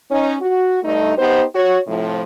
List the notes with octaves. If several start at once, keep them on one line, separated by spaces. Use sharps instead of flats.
C#4 D#4
F#4
G2 A3 D#4
B3 D#4 G4 B4 C5
F#4 C#5
A2 C3 F3